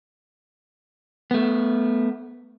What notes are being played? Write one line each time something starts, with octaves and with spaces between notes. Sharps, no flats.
A3 B3